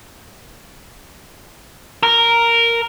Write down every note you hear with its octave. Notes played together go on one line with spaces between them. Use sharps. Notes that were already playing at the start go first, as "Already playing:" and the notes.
A#4